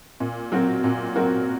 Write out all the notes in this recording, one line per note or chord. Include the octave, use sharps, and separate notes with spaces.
A#2
F#3 C4 F#4 A#4
A#2
F#3 C4 F#4 A#4